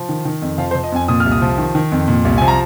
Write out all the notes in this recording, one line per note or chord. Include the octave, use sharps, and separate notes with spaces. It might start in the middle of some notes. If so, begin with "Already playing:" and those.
Already playing: F3
D#3
D#3
F2
F3 F5
C5
F3
D#5
F2 G#5
A#2 D#6
F6
C2
D#6
F3
D#3
D#3
F2
A#2
C2
F3 G#5
A#5